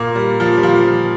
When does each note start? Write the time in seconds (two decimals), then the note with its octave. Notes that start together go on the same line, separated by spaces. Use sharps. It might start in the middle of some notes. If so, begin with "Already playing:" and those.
Already playing: A#2 A#3
0.15 G3
0.40 F3
0.57 G3
0.63 F3